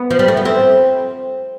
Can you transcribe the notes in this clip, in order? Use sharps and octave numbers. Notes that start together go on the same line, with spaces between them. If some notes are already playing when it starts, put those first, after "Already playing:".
Already playing: B3
F3
G3
A3
B3
C4